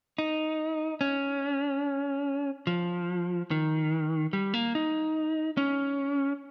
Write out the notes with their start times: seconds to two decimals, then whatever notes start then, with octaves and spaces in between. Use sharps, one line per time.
0.18 D#4
1.01 C#4
2.67 F3
3.51 D#3
4.33 G3
4.54 A#3
4.75 D#4
5.57 C#4